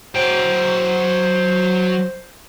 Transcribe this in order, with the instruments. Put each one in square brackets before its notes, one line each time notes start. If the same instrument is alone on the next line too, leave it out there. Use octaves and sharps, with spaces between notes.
[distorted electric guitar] F#3 G5 [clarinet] C5